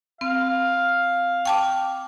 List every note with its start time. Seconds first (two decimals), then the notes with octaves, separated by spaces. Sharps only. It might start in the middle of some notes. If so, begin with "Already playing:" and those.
0.21 C4 F5
1.45 G5 A5 D6